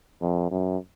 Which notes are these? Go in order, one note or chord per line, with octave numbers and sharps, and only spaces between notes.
F2
F#2